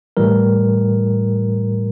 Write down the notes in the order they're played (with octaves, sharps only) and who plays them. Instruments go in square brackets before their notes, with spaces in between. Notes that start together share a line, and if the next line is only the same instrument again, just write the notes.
[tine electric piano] A2 E3 G3 A#4